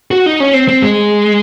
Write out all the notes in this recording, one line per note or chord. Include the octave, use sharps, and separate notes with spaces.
F#4
D#4
C#4
C4
C4
G#3